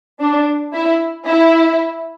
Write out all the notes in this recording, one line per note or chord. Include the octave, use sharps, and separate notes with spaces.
D4
E4
E4